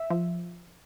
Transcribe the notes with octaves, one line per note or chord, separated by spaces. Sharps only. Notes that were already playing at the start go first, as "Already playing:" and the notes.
Already playing: E5
F3